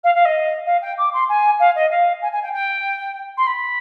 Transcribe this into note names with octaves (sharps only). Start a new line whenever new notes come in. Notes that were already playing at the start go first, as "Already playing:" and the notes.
F5
F5
D#5
F5
G5
D6
C6
G#5
F5
D#5
F5
G#5
G#5
G5
G5
C6
B5